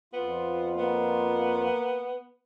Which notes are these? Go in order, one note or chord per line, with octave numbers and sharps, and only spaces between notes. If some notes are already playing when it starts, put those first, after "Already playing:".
F2 B3 F4
A#3 B3